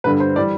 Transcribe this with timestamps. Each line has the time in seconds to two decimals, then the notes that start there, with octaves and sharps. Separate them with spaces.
0.04 G2 D3 G3 B4
0.20 C5
0.36 E3 G3 D5